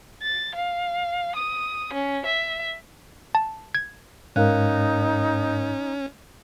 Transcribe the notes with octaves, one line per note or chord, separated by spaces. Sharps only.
A6
F5
D#6
C#4
E5
A5
G#6
G#2 C#4 D#4 A#4 F5 F#6